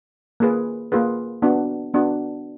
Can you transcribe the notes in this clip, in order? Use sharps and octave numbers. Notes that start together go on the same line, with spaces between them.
A#3 F4 G#4 B4
A#3 F4 G#4 B4
B3 D4 F#4
B3 D4 F#4